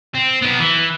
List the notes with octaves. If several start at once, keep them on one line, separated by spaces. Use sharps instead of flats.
C4
B3 D#4
E3